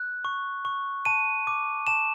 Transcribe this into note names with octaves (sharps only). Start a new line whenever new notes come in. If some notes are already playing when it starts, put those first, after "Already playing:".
Already playing: F#6
C#6
C#6
A5 D#7
D6
A5 E7